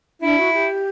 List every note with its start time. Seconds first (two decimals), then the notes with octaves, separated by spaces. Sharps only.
0.21 D4 E4
0.38 F#4
0.53 G4